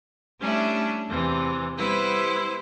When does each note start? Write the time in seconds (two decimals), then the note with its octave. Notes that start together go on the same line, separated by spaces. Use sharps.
0.40 G3 A3 C#4 D4 E4
1.09 E2 C3 E3
1.77 G3 B3 E4 B4 C5